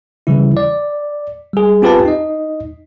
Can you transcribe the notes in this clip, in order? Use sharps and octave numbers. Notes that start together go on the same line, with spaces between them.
C#3 E3 G3 E4
D5
G3 G#4
C4 F4 G4 B4 G#5 A5
D#4 D#5